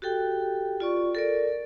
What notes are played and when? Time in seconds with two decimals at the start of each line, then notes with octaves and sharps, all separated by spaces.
0.02 F#4 G4 A4 G5
0.80 F4 D5 C#6
1.15 A4 A#4 D5